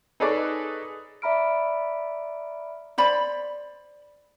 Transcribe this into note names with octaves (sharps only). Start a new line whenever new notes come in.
D#4 G#4 A4 B4 C#5 D5
D5 E5 A#5 B5 F6 D7
C5 D5 B5